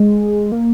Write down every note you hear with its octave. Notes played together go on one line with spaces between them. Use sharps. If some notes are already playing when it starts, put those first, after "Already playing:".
Already playing: G#3
A#3